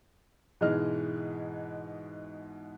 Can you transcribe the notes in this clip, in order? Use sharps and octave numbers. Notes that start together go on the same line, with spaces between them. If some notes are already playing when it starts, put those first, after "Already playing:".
G#2 B2 E3 G#3 D#5 F6